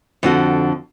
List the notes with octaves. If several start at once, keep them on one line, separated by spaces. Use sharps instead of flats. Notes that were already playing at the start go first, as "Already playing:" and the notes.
F2 D3 F#4